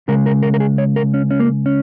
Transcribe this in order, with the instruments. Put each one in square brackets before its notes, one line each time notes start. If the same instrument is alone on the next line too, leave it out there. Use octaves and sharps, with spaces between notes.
[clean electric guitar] C#3 G#3 A#4
A#4
A#4
A#4
G#4
C#5
A#4
C#4
C#4
A#3
C#4